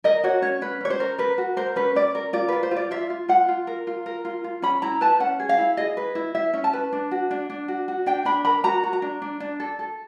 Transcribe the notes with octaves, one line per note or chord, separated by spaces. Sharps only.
A#4 D#5
F#4 C#5
C#4 C#5
C#4 B4
C#4 C#5
C5
A#4
A#4 B4
F#4
A#4 C5
C#4 B4
C#4 D5
A#4
F4 D5
F4 B4
C5
F4
D5
F4 E5
F4
F4 F#5
F4
A#4
F4
A#4
F4
F4
C#4 B5
E4 A#5
B4 A5
C#4 F#5
G#4
F5
E4
G#4 D#5
B4
E4
E4 E5
C#4
A5
B4
D4
F#4
D4
D4
F#4
F#4
D4 G5
D4 B5
A#4 B5
F#4 A#5
F#4
A#5
D4
D4
D4
A4
A4